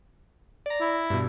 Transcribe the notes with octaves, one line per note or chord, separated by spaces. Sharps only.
D5 A#5
E4
G2 B2